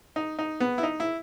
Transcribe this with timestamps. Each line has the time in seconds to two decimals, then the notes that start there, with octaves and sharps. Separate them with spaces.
0.16 D#4
0.39 D#4
0.60 B3
0.78 E4
0.83 D#4
1.00 E4